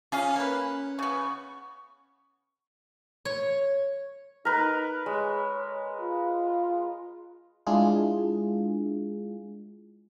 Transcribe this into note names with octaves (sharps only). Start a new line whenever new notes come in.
C#4 F4 G#4 F5
A#3 B4
C#3 B3 C#6
C#5
D#4 A#4 B4
G#3 C#5
F4
G#3 D4 E4 F4 G#4